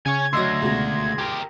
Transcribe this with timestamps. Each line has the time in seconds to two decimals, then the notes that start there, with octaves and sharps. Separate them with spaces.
0.06 C#3 C#5 G#5 G#6
0.33 D2 F#3 D#5 C6 E6 A#6
0.62 C#2 B2
1.18 G4 A#4